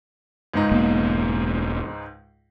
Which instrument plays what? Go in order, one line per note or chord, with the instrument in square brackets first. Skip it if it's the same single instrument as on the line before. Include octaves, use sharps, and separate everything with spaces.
[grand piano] C#2 G#2 D#4
[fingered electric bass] E1 A#3 B3